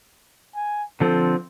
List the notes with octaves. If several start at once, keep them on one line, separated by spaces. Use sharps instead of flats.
G#5
D3 F3 C4 A4